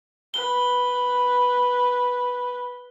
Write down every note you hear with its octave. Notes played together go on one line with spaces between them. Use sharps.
B4 G7